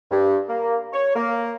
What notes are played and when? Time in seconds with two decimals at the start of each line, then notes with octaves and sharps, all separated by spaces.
0.11 G2
0.49 A#3
0.93 C#5
1.15 A#3